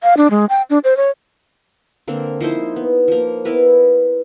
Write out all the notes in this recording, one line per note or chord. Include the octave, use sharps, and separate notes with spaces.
F5
D4
G#3
G5
D4
C5
C#5
D3 A#3 C4
F3 D#4 E4 C5
B3
F3 A#3
B3 E4 A#4 B4